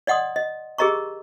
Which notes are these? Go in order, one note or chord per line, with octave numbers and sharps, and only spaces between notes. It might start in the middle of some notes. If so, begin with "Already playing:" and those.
D5 D#5 F#5 C6 D#6
D#5
G4 G#4 A#4 D#5 A#5 C#6